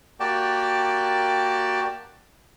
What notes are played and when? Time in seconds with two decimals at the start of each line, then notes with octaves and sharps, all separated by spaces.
0.20 A#3 F#4 G4 D5 G5 A5